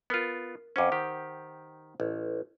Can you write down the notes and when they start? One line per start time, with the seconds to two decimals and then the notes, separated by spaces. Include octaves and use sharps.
0.10 B3 F4 A#4 F6
0.76 F2 C#4 C5 F#5 D6
0.92 D#3 G4
2.00 A1